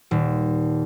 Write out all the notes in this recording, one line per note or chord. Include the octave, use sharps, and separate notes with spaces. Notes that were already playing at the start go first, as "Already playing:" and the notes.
D#1